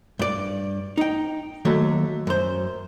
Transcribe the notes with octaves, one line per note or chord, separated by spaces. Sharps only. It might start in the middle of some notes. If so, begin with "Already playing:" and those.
G2 D5
D#4 G5
D#2 F#3 A3
F#2 C5